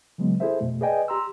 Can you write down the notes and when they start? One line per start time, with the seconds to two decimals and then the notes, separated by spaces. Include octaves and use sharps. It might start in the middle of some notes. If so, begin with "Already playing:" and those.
0.18 C#3 E3 F#3 G#3 B3
0.40 E4 G#4 A4 C5 E5
0.60 F2 B2 A3
0.81 G#4 B4 D5 D#5 G5 G#5
1.08 G4 A#5 C6 E6